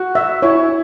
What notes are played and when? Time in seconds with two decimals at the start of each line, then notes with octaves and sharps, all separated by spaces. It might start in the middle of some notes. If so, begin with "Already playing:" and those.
Already playing: F#4
0.15 E5
0.42 E4 C#5